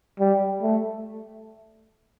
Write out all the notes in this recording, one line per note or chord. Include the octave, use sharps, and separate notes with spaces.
G3
A3